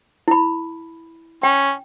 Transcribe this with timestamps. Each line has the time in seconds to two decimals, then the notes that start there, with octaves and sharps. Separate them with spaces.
0.28 E4 B5
1.43 C#4 G5